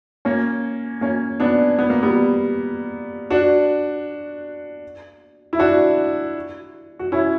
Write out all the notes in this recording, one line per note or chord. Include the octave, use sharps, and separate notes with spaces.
A#3 C#4
A#3 C#4
B3 D4
B3
A#3
G3 B3
D4 F#4
E4
D4 F#4
F#4
C#4 E4